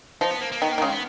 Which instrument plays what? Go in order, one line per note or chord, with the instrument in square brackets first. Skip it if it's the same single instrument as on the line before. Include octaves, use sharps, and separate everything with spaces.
[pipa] F3 [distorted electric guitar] D#4
[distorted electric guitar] B3
A#3
A#3
[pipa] D#3 [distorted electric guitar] B3
[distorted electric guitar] A#3
[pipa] D#3
[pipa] C#3 [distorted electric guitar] G#3
[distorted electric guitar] B3